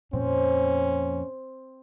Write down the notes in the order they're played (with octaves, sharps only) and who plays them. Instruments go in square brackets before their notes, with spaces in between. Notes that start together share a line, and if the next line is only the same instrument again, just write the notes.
[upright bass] F2 A#2 [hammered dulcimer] C4 [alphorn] C#4